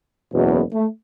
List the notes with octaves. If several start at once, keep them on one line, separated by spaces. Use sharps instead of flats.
F#1 E2 B2
A3